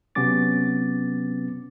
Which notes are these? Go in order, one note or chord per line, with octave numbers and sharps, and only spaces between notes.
C3 F#3 B3 C#4 D6 A6